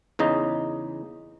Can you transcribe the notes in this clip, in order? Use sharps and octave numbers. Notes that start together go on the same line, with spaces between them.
E2 C#3 D#4 D#5